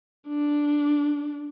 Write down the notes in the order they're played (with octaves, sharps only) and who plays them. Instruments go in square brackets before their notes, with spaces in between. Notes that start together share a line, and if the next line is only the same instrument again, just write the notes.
[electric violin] D4